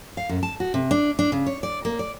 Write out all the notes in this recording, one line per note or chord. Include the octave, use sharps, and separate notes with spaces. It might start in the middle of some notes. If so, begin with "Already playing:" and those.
F5
F#2
A5
F#4
C3
D4
D4
C#3
C#5
D5
A#3
D5